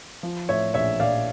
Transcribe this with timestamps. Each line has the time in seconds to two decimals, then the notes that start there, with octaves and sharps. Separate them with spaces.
0.23 F3
0.49 A2 C#5 E5
0.74 A#1 C#5 E5
1.00 A#1 D5 F5